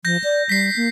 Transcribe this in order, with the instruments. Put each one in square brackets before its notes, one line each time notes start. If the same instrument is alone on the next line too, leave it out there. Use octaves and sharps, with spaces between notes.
[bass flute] F3 [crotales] G6 A#6
[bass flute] D5
[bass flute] G3 [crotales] B6 C7
[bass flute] A#3